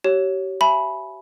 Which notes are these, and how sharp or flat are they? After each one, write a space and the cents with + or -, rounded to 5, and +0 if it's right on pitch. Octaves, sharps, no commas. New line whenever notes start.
G4 -35 C#5 +0
E5 +15 G#5 +35 B5 -5